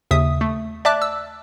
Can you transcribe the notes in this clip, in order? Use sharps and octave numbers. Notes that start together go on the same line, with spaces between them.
D#2 C#3 E5 D#6
A3
D5 E5 A5 D6 F#6
E6